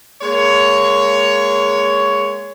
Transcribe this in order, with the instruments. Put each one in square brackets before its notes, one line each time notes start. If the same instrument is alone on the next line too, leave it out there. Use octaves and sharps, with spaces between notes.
[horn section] G#3 A#3 C#5